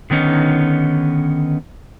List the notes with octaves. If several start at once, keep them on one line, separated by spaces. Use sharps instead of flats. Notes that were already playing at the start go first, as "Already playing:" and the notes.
D3 D#3 B3 C#4 D#4